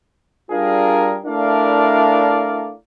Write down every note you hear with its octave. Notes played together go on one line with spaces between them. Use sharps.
G3 D4 F4 G#4 A#4
A3 D4 E4 A#4 D5 F5